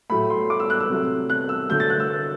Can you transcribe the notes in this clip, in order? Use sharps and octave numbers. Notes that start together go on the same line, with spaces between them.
A2 F#3 A3 B5
C6
D6
E6
F#6
E6
C3 F#3 A3
F#6
E6
D3 F#3 A3 G6
A6
F#6
E6